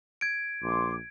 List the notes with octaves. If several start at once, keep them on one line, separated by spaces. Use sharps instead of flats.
G#6 D7
A#1 C6 D6